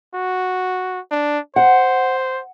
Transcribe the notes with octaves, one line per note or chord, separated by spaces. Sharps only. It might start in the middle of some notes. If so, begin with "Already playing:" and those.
F#4
D4
C5 F#5